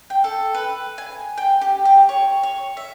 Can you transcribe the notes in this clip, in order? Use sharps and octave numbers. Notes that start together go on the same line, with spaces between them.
G5
A4
B4
G#5
G5
G4
G4
C#5
C#5
E5